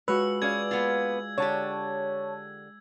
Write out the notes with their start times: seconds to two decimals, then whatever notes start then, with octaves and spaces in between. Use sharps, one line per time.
0.08 G#3 F4 F#4 B4 C#5 E6
0.42 C#4 G#4 D5 F5 G#6
0.71 A#3 B3 F4
1.38 D3 G4 C#5 A5